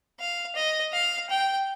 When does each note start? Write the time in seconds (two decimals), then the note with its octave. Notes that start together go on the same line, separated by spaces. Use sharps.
0.20 F5
0.55 D#5
0.93 F5
1.30 G5